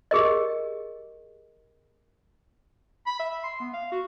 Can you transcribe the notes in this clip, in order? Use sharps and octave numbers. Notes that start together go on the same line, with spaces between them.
G4 G#4 A#4 D#5
B5
E5
C6
B3
F5
F#4